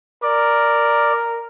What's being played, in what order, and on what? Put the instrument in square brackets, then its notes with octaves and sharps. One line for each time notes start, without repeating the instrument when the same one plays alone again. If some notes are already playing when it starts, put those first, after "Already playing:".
[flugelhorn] A#4 [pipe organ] D5